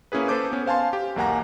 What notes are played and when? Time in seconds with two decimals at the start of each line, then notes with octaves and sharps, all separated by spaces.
0.12 A#3 C#4 E4 G#4 B4
0.28 A4 B4 C5 A5 D6 G6
0.51 B3 C#4
0.66 C5 F5 G#5 A5 C6
0.93 G4
1.16 B1 E2 A#3 F#5 G#5 A#5